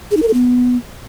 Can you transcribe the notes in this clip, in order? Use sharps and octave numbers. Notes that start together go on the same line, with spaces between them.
G#4
D#4
A#4
A4
B3